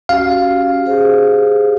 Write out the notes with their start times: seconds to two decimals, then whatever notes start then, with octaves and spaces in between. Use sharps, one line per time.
0.09 C#4 F#4 G4 F5
0.86 G4 G#4 C5